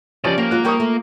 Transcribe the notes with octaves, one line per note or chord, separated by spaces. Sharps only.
C#3 F3 G3 C#4 D5 D#5
A#3 G4
F#3 G#3 F4 F#6
F3 G3 A#4 G5 C#6 D#6
A3 F4